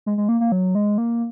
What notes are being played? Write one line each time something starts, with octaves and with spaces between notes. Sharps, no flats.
G#3
G#3
A#3
A#3
F#3
G#3
A#3